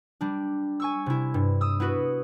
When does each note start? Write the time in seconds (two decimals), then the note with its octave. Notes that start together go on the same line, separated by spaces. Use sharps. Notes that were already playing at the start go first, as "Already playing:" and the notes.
0.21 G3 D4
0.80 G#5 C#6 E6
1.06 C3 E4
1.34 G2
1.61 D#6 E6
1.80 B3 E4 F#4 B4